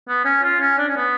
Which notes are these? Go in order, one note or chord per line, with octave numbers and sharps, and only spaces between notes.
B3
C#4
F4
C#4
D4
C#4
B3